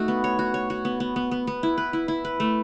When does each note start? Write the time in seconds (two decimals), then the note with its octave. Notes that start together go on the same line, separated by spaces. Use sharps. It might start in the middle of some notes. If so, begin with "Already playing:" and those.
Already playing: A3 D#4 F#4
0.08 B3
0.24 C#5
0.39 F#4
0.54 C#5
0.70 F#4
0.85 B3
1.00 B3
1.16 B3
1.31 B3
1.47 B3
1.63 E4
1.78 B4
1.93 E4
2.08 E4
2.25 B4
2.40 A3